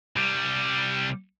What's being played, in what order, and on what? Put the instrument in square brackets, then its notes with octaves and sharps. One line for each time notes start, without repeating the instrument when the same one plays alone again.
[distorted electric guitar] C2 G3